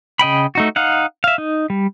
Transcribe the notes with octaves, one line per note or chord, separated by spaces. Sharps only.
C#3 D#5 G5 B5
A3 D#4 F#4
D#4 F5 F#5
E5 F5
D#4
G3